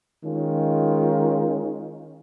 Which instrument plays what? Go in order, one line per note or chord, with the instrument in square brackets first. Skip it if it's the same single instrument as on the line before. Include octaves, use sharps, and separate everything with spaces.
[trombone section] D#3 G#3 C#4 F4